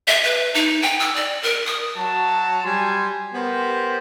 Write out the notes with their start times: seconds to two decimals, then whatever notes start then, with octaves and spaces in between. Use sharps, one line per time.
0.08 E5
0.24 B4
0.54 D#4
0.82 G5
1.00 E6
1.15 D5
1.43 A#4
1.66 D#6
1.96 F#3 F#4 A5
2.64 G3 G#5 C6
3.34 B3 G4 A#4 C5